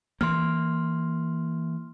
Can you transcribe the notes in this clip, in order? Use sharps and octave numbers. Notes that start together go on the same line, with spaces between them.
E3 A#3 C6 F6